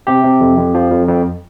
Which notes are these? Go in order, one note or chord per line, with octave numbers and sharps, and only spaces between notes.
C3 G4
C3
F2
F2
F3
F2
F2